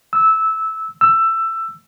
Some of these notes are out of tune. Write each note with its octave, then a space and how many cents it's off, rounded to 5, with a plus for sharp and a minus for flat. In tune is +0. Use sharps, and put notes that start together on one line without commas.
E6 -15
E6 +15